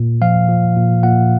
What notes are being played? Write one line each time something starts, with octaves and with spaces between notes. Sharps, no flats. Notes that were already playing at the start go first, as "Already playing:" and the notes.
Already playing: A#2
F3 F5
F3
A#2
A#2 F#5